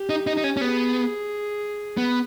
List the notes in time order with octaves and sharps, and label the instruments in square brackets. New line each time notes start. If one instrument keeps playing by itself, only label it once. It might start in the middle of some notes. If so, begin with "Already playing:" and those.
Already playing: [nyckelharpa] G4
[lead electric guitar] D#4
D#4
D#4
C#4
C#4
[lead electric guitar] B3 [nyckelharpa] G#4
[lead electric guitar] B3